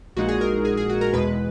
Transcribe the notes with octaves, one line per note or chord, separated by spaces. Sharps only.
A#1 A#2 G#3 D#4 F#4
G#4
A#4
G#4
G#4
F#4
A#4
E2 B2 G#3 B4